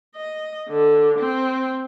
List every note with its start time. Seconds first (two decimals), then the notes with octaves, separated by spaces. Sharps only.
0.16 D#5
0.69 D3
1.19 C4